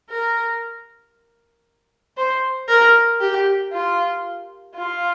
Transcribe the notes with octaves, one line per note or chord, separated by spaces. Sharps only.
A#4
C5
A#4
G4
F4
F4